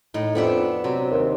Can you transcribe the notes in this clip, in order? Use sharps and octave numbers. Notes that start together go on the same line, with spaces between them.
A2 D#4
F2 B3 D4 E5
C3 F#3
D#2